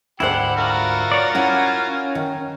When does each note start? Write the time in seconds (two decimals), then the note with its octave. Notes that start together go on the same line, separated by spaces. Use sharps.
0.20 D2 G#2 E4 G4 C5 F#5
0.57 F4 F#4 A#4
1.12 C#5 D5
1.35 C#4 E4 F#5
2.15 D#3